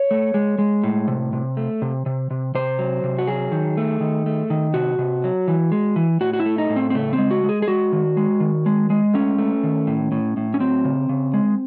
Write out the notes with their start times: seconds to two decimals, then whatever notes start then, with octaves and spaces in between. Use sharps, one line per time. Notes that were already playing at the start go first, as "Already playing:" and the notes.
Already playing: C#5
0.11 A3
0.34 G#3
0.59 G#3
0.84 A2
1.08 C3
1.33 C3
1.57 A3
1.82 C3
2.06 C3
2.31 C3
2.55 C3 C5
2.79 F#3
3.04 C3
3.19 F#4
3.27 F#3 G#4
3.52 D#3
3.77 A3
4.01 D#3
4.26 A3
4.50 D#3
4.74 C3 F#4
4.99 C3
5.24 F#3
5.48 E3
5.72 G#3
5.96 E3
6.21 A2 F#4
6.33 F#4
6.40 E4
6.46 A3
6.58 D#4
6.70 A2
6.76 C4
6.90 C4
6.95 C#3 A3
7.13 C4
7.18 G#3
7.31 F#4
7.43 G#3
7.49 G#4
7.62 G#4
7.68 G#3 F#4
7.92 D#3
8.17 G#3
8.40 D#3
8.66 G#3
8.90 G#3
9.14 A3 C#4
9.38 A3
9.63 D#3
9.87 A2
10.12 A2
10.37 A2
10.54 C#4
10.60 F#3 C4
10.85 C#3
11.09 C#3
11.34 G#3